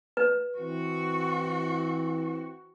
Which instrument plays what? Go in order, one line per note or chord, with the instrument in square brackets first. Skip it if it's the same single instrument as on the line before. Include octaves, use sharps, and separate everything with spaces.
[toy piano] B4
[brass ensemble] E3 C4 [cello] F#4